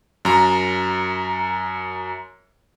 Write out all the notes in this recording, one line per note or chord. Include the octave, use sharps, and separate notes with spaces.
F#2 A#5